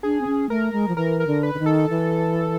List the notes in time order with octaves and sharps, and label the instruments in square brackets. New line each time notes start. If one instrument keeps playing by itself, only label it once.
[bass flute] D4 [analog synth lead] G#4
[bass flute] C4
C#4
[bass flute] A3 [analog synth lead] A#4
[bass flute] G#3
F3
[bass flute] E3 [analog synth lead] A#4
[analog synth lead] A#4
[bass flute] D3
[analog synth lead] B4
[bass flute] D3
D#3
[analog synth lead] A4
[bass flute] E3